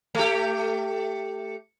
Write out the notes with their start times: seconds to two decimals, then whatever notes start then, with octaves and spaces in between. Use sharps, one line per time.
0.15 A3 G4